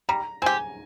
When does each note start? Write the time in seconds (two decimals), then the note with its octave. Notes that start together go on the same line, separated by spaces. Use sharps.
0.09 G3 A#5
0.42 C4 G4 G#5